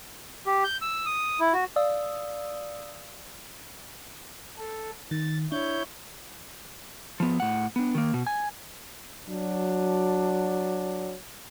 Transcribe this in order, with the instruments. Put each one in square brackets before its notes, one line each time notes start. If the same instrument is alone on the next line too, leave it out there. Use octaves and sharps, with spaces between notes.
[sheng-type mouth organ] G4
G6
E6
D#6
E4
F#4
[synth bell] D5 F5 D#6 E6
[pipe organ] A4
[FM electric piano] D#3 [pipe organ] A6
[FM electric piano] D4 [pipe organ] E4 C#5 G6
[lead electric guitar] F3 B3
A2 F#5
B3 D4
D#3 A#3
B2
G#5
[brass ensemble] F#3 D4